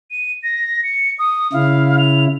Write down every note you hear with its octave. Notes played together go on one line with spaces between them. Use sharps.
D#7
A#6
C#7
D#6
C#3 E4 F5
F7